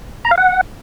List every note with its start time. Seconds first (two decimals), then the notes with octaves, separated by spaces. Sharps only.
0.25 A#5
0.31 F5
0.38 F#5